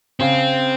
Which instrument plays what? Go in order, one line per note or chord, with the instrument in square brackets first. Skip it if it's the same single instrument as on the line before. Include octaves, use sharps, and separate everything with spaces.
[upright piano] C#3 [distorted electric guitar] C4